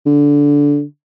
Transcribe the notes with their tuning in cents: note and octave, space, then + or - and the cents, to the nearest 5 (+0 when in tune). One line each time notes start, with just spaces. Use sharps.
D3 -15